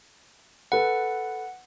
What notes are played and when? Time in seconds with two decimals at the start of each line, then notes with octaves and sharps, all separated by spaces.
0.72 A4 B4 F#5